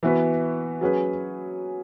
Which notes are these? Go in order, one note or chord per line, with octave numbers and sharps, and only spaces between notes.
E3 B3 F#4 B4
F#3 C#4 G#4 B4